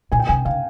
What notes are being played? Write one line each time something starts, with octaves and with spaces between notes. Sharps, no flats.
A#2 G#5
G5
C3 G#5
C#3 F5